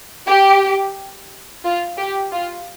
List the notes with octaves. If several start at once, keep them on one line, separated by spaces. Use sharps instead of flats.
G4
F4
G4
F4